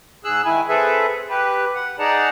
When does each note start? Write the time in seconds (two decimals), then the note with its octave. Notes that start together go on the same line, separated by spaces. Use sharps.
0.24 G#2 G#4 E6 F#6
0.45 D#3 E4 G#5
0.69 C4 G#4 A4 B4 E5
1.29 G4 B4
1.75 F#5
1.99 D#4 G#4 D5 F#5 A5 A#5